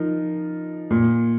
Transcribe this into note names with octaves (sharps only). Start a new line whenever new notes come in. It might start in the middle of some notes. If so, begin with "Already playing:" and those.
Already playing: F3 D#4 A#4
A#2